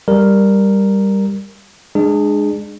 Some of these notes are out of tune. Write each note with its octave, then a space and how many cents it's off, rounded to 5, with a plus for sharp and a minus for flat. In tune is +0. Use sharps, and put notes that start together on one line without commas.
G3 +10 A#4 +0
G#3 +0 D4 +35 G#4 +0